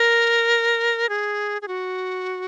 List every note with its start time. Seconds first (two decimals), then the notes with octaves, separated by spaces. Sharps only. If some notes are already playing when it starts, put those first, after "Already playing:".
Already playing: A#4
1.09 G#4
1.62 G#4
1.68 F#4